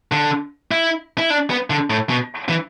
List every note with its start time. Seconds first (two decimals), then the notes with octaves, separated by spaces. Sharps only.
0.12 D3
0.71 E4
1.18 E4
1.30 D4
1.50 B3
1.70 D3
1.90 A2
2.09 B2
2.49 E3